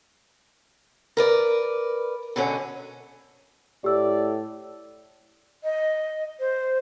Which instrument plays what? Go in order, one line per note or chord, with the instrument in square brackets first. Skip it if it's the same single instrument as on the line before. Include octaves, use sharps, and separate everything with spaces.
[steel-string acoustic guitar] A#4 B4 D5
B2 D3 F#3 C#4
[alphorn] A2 [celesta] G4 E6 [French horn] D5
[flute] D#5
C5